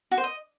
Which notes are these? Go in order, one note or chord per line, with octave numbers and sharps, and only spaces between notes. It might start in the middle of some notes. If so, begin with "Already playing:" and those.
F#4
C5
D#5